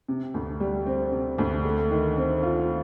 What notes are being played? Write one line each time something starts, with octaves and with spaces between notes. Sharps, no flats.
C3
D2
G3
C4
C3
D2
A3
D#3
C4
F4